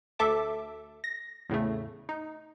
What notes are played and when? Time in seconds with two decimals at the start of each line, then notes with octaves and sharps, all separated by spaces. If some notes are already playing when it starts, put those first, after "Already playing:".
0.19 D2 A4 E5 A5 D6
1.04 A#6
1.49 E2 A2 C#3 A3
2.09 D#4